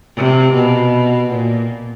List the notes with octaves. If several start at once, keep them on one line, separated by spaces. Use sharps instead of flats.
C3
B2
A#2